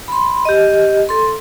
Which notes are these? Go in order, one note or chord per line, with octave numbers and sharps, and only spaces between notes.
B5 C6
G4 D#5
A4 C6